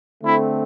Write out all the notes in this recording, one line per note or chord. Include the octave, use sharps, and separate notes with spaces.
D3 A3 C4 E4